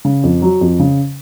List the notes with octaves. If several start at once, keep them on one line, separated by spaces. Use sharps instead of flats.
C#3
F2
F#3
F2
C#3